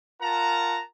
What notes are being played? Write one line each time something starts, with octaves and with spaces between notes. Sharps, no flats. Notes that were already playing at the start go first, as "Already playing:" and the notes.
F4 A#4 F#5 A5 A#5